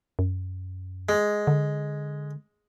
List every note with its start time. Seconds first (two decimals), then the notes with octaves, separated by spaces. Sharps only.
0.19 F#2
1.09 G#3
1.47 D3